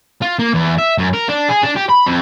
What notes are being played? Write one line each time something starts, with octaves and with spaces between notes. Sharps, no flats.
F4
A#3
E2
E5
F#2
A#4
D4
G#4
D4
G4
B5
F2